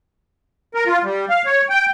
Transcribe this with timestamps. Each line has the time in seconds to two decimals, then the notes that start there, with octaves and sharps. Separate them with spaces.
0.75 A#4
0.87 F4
1.04 G3
1.29 F5
1.46 C#5
1.70 G5